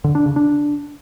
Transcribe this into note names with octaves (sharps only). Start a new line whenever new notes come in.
D3
D4
C#3
D4